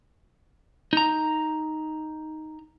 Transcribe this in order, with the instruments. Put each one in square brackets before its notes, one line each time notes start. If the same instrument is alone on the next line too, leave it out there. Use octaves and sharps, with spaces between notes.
[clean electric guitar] D#4 A#5